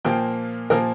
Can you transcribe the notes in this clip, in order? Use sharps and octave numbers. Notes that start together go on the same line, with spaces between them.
A#2 F3 A#3 G5
A#2 F3 A#3 A#4